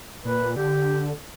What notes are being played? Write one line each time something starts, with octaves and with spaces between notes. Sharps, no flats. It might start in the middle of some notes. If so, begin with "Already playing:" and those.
A#2 B4
D3 G4